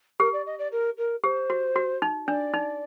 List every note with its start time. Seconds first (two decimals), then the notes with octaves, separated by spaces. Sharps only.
0.20 G4 A#4
0.33 D5
0.46 D#5
0.59 D5
0.72 A#4
0.98 A#4
1.24 G4 C5
1.50 F#4
1.76 F#4
2.02 D#4
2.27 D4 D5
2.53 D#4